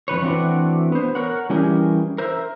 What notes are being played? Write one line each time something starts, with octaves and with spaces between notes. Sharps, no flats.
F2 D#3 B4 C#5
E3 A3 C4 D4 F#4 D5
B3 C5
A#4 C#5 F#5
E3 G3 C#4 G4 G#4 A#4
A#4 C5 E5